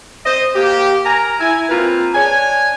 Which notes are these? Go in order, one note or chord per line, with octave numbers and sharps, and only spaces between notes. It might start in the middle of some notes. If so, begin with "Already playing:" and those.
C5 D#5
A#3 G4
A#4 G#5 A#5
E4 G#5
A#3 C4 F4 B4 A#5
D4 C#5 G#5